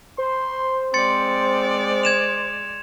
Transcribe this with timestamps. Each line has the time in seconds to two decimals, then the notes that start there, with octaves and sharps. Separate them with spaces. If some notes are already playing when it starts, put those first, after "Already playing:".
0.18 C5 C6
0.94 G#3 C4 D5 C6 A6 C#7
2.03 G#6 E7 F7